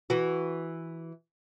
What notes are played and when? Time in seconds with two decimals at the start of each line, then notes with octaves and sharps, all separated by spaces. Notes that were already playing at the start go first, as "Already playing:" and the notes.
0.10 E3 F#4